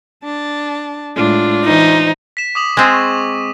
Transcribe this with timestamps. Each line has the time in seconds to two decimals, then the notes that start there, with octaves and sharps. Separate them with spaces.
0.24 D4 A5
1.16 A2 G#3 D4 F4
1.65 E3 D#4 C5
2.37 B6 E7
2.55 D6 D#6 F#7
2.77 G#3 C4 G#4
2.93 C#6